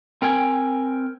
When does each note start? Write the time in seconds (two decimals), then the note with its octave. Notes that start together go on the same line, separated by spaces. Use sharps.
0.22 C4 A#4 G5 G#5